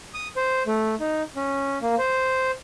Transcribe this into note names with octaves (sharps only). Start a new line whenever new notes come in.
D#6
C5
A3
D#4
C#4
A#3
C5